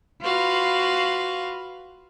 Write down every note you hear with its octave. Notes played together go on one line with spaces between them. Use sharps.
F4 F#4 B4 F5